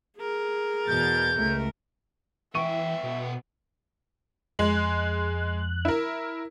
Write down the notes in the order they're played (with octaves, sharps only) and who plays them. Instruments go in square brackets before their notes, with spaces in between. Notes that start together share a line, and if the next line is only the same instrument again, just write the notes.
[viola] G#4 A#4
[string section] E2 B2 A6 [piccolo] G6
[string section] C#2 A3 [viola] A#4
[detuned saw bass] E3 [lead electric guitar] B3 G5 [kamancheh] E5 [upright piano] C#6 D#7
[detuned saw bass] B2
[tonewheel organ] F2 F#6 [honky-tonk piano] G#3
[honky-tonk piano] E4 A#4